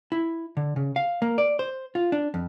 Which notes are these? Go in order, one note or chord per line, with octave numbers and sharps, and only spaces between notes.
E4
D3
C#3
F5
A#3
D5
C5
F4
D4
F2